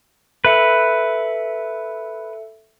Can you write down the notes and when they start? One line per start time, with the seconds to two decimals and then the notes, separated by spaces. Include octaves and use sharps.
0.45 A4 B4 E5 C#7